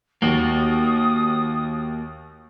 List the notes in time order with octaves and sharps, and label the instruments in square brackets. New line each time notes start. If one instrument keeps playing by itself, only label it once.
[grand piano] D#2 [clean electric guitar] A#3 F#4 [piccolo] D#6